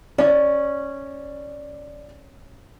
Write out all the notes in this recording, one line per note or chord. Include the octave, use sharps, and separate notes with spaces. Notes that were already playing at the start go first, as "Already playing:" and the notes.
C#4 D5